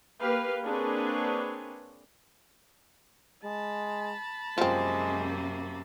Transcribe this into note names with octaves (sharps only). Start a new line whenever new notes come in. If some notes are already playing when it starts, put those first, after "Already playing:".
A#3 G4 B4 F5
A#3 C4 D4 G#4 B4 C#5
G#3 A5 B5
F#2 C3 F3 G#3 A#3 C4